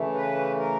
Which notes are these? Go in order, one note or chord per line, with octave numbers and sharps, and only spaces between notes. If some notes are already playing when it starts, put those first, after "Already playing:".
Already playing: C#3 E3 A3
B4
A#4